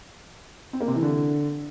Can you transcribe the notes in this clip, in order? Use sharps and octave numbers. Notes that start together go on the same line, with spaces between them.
C4
A#3
C3
E3
D3